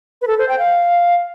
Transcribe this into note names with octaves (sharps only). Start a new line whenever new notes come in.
B4
A4
C5
G5
F5